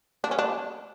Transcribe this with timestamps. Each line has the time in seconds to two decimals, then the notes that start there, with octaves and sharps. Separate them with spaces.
0.24 D4
0.31 C#4
0.39 D4